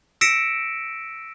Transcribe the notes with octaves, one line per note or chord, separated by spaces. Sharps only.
E6 A#6 B6 C#7 D7 E7